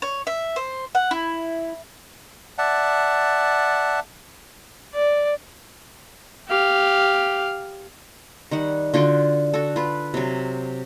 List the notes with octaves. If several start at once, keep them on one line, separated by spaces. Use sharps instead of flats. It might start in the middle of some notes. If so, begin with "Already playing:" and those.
C#5
E5
C5
F#5
E4
D5 E5 F#5 A5
D5
G4 F5
D#3 G3 F#5
D3 F4 F#4 G5
F#4 A4
F4 B4
C3 F#3